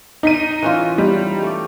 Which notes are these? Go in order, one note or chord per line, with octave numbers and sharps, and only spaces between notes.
D#4 B6 D#7
E3 C#4 F4
G3 D#4
A3 D5